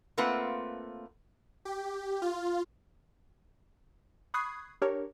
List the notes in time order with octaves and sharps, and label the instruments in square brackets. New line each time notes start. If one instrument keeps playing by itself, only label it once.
[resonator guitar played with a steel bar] A3 A#3 C4 F4 B4 F#5
[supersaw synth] G4
F4
[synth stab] B5 C#6 D#6 F#6 G#6 C7
D4 G4 A#4 C#5